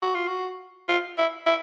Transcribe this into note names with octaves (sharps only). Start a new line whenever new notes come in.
F#4
F4
F#4
F4
E4
E4